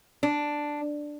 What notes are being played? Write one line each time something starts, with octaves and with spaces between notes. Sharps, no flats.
D4